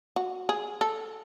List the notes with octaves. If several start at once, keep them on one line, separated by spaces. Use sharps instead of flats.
F#4
G#4
A4